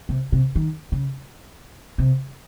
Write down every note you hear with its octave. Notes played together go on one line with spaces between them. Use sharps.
C3
C3
D#3
C#3
C3